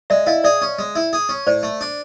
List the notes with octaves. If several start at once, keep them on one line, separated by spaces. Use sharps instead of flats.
G#3 D5 E5
E4 D#5 F5
G#4 D5 E5
C#4
G#3
E4
G#4
C#4
A2 C5 D5
A3
D4